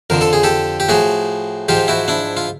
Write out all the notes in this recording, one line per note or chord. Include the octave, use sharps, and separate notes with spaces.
F2 D3 F3 A#4
A4
G#4
G4 A4
G4
A2 F3 F#4 G#4
G#2 F3 F4 G4
E4 F#4
D4 E4
F4